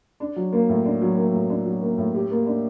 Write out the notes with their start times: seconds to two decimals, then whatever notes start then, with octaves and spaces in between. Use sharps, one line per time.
0.20 D4
0.36 F#3
0.52 A#3
0.69 A2
0.85 D4
1.02 F#3
1.17 A#3
1.34 A2
1.49 D4
1.66 F#3
1.81 A#3
1.98 A2
2.14 G4
2.31 A#3
2.47 D4